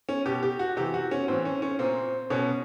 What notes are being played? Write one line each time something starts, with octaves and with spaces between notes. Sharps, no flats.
C#4
B2 G4
G4
F#4
C3 E3 G4
F#4
C#4
A2 E3 C4
C#4
C#4
A#2 C4
B2 C#4